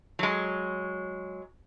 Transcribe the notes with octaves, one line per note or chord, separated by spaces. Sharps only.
F#3 G#3